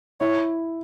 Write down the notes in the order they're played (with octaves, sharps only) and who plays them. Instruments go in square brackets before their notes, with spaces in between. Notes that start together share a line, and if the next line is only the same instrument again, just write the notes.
[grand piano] E4 [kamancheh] C#5